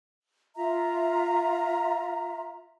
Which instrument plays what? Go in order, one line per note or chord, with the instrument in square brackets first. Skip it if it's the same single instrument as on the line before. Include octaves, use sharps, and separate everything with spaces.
[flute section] F4 E5 A#5